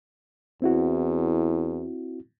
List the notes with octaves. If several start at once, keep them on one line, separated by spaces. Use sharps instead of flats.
E2 C4 E4 F#4